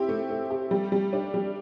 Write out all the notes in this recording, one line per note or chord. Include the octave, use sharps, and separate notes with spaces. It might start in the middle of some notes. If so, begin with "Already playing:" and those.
Already playing: C4 E4 G4
A3
A3
G4
G3
G3
D4
G3